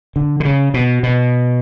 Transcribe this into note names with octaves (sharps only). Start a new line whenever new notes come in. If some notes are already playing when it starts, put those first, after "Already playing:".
D3
D3
C#3
B2
B2